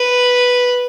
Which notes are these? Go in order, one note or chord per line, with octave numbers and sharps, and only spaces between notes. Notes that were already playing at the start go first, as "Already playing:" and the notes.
Already playing: B4